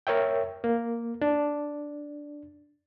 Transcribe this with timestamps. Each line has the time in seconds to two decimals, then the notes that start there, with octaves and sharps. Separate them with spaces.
0.07 A#4 C#5 E5 G5
0.64 A#3
1.22 D4